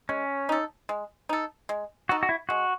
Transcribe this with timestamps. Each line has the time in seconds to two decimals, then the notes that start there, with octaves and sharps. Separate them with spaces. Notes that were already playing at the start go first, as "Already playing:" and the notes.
0.09 G#3 C#4
0.49 D#4 A4
0.89 G#3
1.29 D#4 A4
1.69 G#3
2.09 D#4 F#4 A4
2.23 F#4
2.29 E4
2.49 G#3 F#4